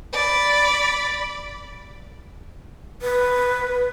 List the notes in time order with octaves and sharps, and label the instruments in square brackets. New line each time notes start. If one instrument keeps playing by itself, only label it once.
[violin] D5 B5
[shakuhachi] B4